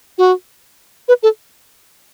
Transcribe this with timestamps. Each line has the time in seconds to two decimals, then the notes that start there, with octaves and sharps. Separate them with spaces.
0.18 F#4
1.08 B4
1.23 A4